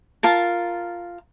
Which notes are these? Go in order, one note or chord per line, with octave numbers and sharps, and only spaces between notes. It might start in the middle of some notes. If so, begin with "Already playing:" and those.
F4 A#4 A5